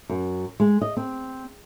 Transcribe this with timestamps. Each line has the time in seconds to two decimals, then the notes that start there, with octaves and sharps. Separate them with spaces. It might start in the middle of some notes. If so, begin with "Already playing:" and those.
0.09 F#2
0.60 G#3
0.81 D#5
0.97 C4